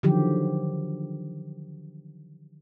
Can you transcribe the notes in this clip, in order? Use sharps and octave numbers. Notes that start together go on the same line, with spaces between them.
D3 D#3 F3 F#3 G4